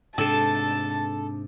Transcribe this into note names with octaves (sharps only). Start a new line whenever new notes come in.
G#2 C3 D4 A4 A5